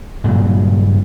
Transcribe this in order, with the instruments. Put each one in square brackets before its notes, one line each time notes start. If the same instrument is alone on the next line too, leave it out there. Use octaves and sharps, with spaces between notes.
[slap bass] G2 A#2 C#3 F#3